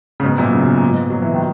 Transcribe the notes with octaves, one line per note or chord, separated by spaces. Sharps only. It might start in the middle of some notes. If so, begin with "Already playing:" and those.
C#3
G#2 B2
F#2 A#2
C#3
B2
A#2
G#2 B2
F#3
E3
D#3